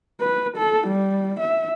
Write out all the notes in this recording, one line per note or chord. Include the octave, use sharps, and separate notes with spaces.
B4
A4
G3
E5